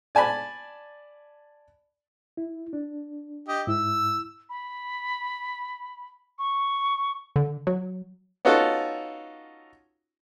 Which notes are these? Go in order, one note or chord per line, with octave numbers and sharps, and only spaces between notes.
D5 G#5 A5 B5
E4
D4
G4 D#5
G#2 E4 E6
B5
C#6
D3
F#3
B3 C#4 D#4 F4 F#4 A4